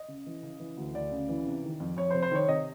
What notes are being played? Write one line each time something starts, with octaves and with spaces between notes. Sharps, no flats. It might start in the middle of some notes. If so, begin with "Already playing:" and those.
Already playing: D#5
C#3
E3
C#3
E3
D2
D2 D5
C#3
E3
C3
D#3
F2
F2 C#5
C5
C3
C5
D#3 C#5
C3 D#5